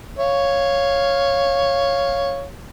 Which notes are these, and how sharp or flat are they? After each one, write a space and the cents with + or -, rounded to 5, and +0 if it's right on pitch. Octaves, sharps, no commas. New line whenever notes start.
C#5 +0 F5 +0